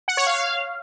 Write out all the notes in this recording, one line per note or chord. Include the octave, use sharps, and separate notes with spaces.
F#5
C#5
F5